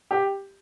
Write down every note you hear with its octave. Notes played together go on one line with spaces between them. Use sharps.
G4